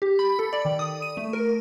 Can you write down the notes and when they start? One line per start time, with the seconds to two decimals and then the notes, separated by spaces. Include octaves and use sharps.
0.02 G4
0.19 B5
0.39 A4
0.53 D5
0.65 D#3
0.79 D#6
1.02 D#7
1.17 A3
1.33 A#4